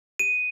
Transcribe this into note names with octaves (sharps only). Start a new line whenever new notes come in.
D#7